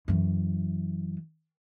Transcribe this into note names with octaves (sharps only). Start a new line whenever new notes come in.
F#2 E3